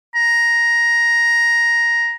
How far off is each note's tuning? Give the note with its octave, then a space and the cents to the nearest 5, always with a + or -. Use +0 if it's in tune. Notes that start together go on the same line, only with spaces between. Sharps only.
A#5 +5